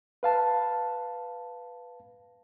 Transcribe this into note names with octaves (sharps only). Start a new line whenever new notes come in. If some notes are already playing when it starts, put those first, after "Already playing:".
B4 F5 A5